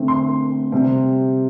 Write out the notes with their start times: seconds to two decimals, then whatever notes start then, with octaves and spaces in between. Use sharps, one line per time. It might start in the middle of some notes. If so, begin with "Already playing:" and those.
Already playing: D3 A3 C4
0.08 C6
0.72 C3 G3 C4